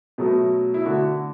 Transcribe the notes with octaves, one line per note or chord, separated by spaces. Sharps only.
B2 F#3 A3
E4
D3 A3 F#4